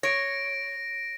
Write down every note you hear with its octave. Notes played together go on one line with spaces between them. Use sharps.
C#5 A#6 D7